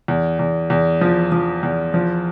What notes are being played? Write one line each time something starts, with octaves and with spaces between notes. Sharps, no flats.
E2
E2
E2
F3
F3
E2
F3